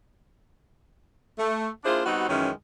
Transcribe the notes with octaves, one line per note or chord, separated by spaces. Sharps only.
A3
A#3 D4 E4 F4 G#4 C5
G3 B3 C4 D#4 F#4
F#2 D#3 E3 G#3 C#4